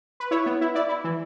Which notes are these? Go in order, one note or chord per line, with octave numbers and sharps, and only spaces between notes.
B4
E4 C#5
B3
E4
E4 D5
E4
E3